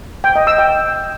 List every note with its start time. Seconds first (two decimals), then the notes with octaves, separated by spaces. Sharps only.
0.24 G5
0.35 D#5
0.47 E6
0.59 G5